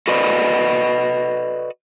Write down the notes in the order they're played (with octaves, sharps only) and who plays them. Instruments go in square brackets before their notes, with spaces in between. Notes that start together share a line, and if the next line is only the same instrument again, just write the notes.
[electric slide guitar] F#4 A4 B4 D5 D#5